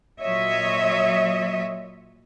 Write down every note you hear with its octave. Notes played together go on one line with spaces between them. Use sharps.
A#2 F#3 C#5 D#5 E5